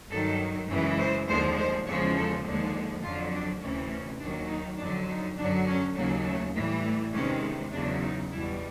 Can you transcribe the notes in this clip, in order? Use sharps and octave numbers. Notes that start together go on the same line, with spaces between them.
G2 D#3 F#3 A4
F#2 C#3 E3 G#3
C5
D#2 D3 F3 G#3 C5
C5
E2 C#3 F3 G#3 C#5
A4
D#2 D3 F3 G#3
F2 D3 F#3 F4
D4
D2 C3 E3 C#4
C#4
D#2 D#3 F#3 D4
D#4
F2 D3 F#3 D4
D#4
F#2 D3 F#3 D4
C#4
D#2 C#3 F#3 A#3
A3
A2 E3 G3 G#3
A3
E2 C3 D#3 G#3 C#4
E2 C#3 F#3 D4
D#4
E2 B2 G3 E4